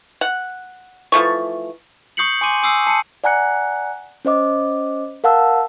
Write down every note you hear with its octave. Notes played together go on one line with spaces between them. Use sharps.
F#5
E3 F3 A3 C#6
C#6 D#6 G6 C7 C#7 F#7
G#5 C6 D6 D#7
G#5 D#6 E6 C7
A5 C7 C#7
D5 F#5 G#5 A#5 F#6 C#7
C#4 C5 D#5 D6
A#4 F5 F#5 A5 E6